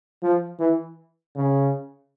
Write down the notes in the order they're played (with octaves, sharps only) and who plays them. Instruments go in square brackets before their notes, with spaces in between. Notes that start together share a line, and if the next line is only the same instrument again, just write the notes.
[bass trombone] F3
E3
C#3